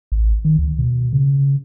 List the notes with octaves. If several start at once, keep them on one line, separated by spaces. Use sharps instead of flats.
A1
D#3
D2
B2
C#3